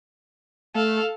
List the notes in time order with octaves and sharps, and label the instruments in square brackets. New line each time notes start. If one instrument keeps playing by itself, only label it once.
[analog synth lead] A3 [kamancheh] A4 F5